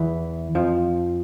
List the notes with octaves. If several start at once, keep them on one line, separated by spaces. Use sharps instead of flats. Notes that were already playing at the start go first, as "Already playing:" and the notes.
Already playing: E2 E3
F2 F3